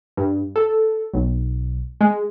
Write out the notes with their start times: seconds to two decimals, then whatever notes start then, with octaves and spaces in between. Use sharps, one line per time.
0.17 G2
0.56 A4
1.14 B1
2.01 G#3